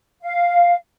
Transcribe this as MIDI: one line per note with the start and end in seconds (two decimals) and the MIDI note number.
0.21 0.76 77